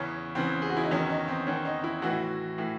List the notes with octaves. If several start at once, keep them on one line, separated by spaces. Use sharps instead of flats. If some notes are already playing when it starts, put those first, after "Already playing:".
Already playing: E2 C#3 E3 C#4
E2 C#3 E3 C4
G#4
F#4
E4
D#4
E2 D#3 C#4
D#4
C4
E2 D#3 C#4
D#4
E4
A2 E3 F#4
A2 E3